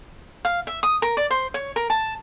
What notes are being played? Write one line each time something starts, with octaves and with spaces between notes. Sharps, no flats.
F5
E5
D#6
A#4
D5
C5
C#5
A#4
A5